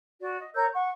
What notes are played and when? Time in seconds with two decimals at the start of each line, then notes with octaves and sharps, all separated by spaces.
0.19 F#4 D5
0.39 D#5
0.54 A#4 C#5 E6 G6
0.72 F#5 C#6